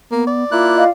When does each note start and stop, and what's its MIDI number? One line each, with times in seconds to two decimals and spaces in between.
0.11 0.26 58
0.11 0.44 59
0.27 0.91 74
0.52 0.84 58
0.52 0.84 64
0.52 0.89 65
0.52 0.84 90
0.77 0.87 75
0.77 0.87 77